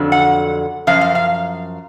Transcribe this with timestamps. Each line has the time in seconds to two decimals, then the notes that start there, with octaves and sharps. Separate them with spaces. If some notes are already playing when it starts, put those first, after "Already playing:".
Already playing: F2 D3 F#3
0.12 F#5
0.87 F#2 F3 F5
1.01 F5
1.15 F5